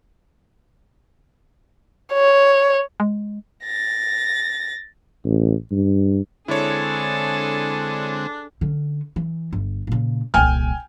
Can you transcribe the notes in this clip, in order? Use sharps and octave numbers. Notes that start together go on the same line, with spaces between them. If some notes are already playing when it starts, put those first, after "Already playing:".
C#5
G#3
A6 A#6
A1
G2
D3 G#3 C4 D4 E4 G#4 A4 C#5
D3 C#4
E3
G1
A#2 C#3
D#1 C2 G5 G#5 F6